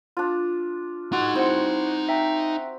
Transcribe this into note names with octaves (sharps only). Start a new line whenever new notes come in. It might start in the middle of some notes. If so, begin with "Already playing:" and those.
D4 F4
D#4 F#4 C6
C4 E4 F#5
E5 G5 A#5